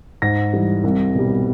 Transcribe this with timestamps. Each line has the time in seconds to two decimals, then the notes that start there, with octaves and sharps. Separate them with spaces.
0.22 G#2 A#6
0.53 E3 G3
0.84 C2
1.15 B2 G3